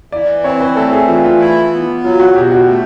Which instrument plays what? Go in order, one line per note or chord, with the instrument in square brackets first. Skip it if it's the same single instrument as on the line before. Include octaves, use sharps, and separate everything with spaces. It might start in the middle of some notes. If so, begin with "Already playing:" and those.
[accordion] E3 [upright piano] D5
[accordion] C4 [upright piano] C#5
[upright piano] B4
[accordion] A3 [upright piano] A4
[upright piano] G#4
[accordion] E3 [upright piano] F4
[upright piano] F4
[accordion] E4
B3
[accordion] F#3 [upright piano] F4
[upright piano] F#4
[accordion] B2 [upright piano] G4
[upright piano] F#4
[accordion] A3